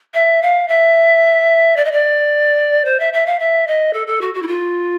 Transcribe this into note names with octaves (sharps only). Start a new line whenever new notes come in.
E5
F5
E5
D5
D#5
D5
C5
E5
E5
F5
E5
D#5
A4
A4
F#4
F#4
E4
F4